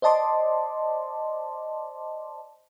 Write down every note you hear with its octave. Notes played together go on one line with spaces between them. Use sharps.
C5 D5 D#5 A5 C6 D6